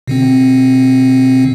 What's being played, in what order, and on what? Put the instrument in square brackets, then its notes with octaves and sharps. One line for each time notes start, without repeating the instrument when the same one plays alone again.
[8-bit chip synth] B2 D3 C4